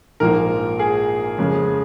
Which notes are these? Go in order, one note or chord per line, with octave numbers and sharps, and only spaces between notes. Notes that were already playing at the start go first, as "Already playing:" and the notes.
A#1 G#2 F3 A#3 A#4
G#4
F2 C#3 G#3